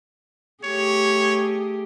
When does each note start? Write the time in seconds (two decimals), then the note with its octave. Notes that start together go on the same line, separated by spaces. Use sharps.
0.64 A3 G4 G#4 C#5